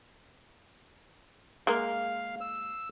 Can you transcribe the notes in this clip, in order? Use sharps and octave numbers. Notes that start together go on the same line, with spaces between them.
G#3 A#3 F5
E6